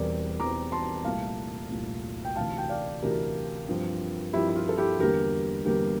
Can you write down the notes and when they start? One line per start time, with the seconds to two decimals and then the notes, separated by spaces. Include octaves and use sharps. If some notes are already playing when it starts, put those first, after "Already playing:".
Already playing: E1 E2 E3 G3 C4 A#4 D5
0.40 E1 E2 E3 G3 C4 A#5 D6
0.72 A5 C6
1.05 C2 A#2 A3 F5 A5
1.70 C2 A#2 A3
2.25 G5
2.36 D2 C3 E3 F5 A5
2.58 G5
2.69 D5 F5
3.02 D2 C3 E3 G4 A#4
3.68 G2 F3 C4
4.33 G2 F3 C4 E4 G4
4.49 E4
4.55 F4
4.69 A4
4.77 E4 G4
4.99 E2 D3 G3 A#3 G4 A#4
5.65 E2 D3 G3 A#3 G4 A#4